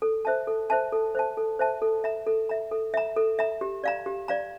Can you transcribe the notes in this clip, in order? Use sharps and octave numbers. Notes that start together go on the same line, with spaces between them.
A4
C5 E5 A5
A4
C5 E5 A5
A4
C5 E5 A5
A4
C5 E5 A5
A4
E5 A#5
A4
E5 A#5
A4
E5 A#5
A4
E5 A#5
G4
D5 F5 A#5
G4
D5 F5 A#5